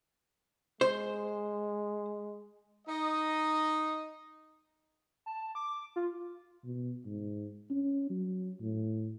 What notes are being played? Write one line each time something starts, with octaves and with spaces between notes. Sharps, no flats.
G#3 C5
D#4 D#5
A5
D6
F4
B2
G#2
C#4
F#3
A2